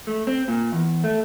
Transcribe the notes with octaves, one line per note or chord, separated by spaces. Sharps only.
A3
C4
A#2
E2
A3